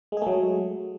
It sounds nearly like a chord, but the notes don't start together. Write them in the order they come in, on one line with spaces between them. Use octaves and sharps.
G#3 G#4 A3 F#3